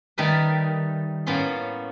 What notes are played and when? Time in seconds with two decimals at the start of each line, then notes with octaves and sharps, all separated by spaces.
0.18 D#3 G3 A3 A#4 B4
1.26 A2 A#3 B3 C#4 C6